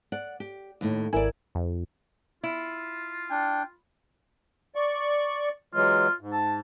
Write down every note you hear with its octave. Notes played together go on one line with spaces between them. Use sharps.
D5 F#5
G4
D#2 A2
G#1 E4 A#4 D5 G#5
F2
E4 F4
D4 G5
D5 C#6
E3 F#3 G#3 F4
G#2
A5